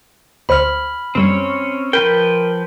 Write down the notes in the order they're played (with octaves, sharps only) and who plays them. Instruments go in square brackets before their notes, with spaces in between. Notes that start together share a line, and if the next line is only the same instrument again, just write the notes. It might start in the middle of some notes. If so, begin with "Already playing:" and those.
[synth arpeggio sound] D2 C5 C#7 [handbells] B5 F6
[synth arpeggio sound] F#2 G3 [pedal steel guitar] C4 C#4 C#5
[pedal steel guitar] F3 B4 G5 [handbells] A#4